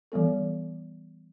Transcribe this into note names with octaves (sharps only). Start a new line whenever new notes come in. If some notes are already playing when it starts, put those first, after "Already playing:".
E3 G3 B3 A4